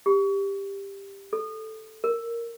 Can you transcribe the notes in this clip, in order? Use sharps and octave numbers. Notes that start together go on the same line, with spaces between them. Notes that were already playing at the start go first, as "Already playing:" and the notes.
G4
A4
A#4